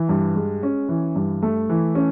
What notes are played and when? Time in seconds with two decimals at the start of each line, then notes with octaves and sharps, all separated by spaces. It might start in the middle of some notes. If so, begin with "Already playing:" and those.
Already playing: E3
0.09 G2
0.35 G#3
0.63 C#4
0.89 E3
1.15 G2
1.43 A3
1.70 E3
1.95 C#4